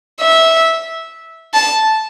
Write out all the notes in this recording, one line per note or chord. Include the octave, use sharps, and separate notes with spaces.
E5
A5